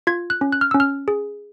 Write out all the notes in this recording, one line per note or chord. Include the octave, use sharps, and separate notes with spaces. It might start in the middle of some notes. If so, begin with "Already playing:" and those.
F4 G#6
F#6
C#4
F#6
F6
C#4 E6
F6
G#4